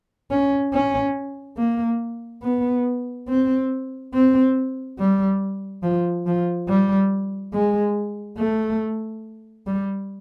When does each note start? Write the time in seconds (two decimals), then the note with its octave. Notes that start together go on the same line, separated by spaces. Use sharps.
0.31 C#4
0.74 C#4
1.58 A#3
2.43 B3
3.29 C4
4.14 C4
4.99 G3
5.83 F3
6.27 F3
6.69 G3
7.54 G#3
8.38 A3
9.67 G3